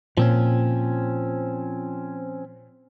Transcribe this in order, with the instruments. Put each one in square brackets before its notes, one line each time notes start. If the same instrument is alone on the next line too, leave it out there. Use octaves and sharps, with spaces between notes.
[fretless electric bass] A#2 [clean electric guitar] F3 C4 C#4